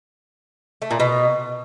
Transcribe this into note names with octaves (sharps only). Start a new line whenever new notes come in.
A3
A#2
B2